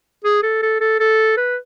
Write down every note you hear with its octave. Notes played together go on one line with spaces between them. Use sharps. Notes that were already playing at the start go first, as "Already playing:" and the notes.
G#4
A4
A4
A4
A4
B4